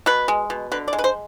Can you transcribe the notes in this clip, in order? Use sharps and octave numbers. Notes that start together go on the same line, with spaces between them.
B2 B4
G#3
B2
D3 B4
D5
G#3
B4
C5